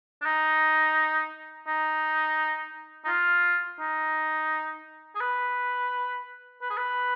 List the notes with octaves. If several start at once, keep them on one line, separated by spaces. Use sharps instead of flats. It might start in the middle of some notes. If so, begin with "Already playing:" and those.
D4
D#4
D#4
D#4
F4
D#4
G#4
B4
B4
G#4
B4